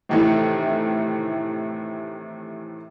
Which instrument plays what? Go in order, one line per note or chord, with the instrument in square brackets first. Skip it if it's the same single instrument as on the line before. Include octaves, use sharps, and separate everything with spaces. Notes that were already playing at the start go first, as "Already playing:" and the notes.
[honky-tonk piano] A2 C3 D#3 E3 A3